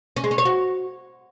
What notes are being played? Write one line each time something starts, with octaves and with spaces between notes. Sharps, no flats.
C#4
G#3
C#4
C#5
F#4